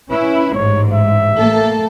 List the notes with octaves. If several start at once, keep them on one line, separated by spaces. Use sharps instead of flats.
C#4 E4 B4
A1 G#2 C#5
E5
A3 A#3 A4